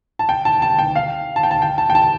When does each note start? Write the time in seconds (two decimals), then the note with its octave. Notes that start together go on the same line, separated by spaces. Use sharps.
0.19 A5
0.29 G5
0.45 A5
0.62 A5
0.79 G5
0.96 F5
1.36 A5
1.43 G5
1.51 A5
1.62 G5
1.78 A5
1.90 G5
1.95 A5